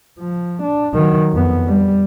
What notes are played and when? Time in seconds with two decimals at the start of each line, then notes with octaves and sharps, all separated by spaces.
0.19 F3
0.63 D4
0.95 D#3 F#3
1.32 F2 B3
1.68 G3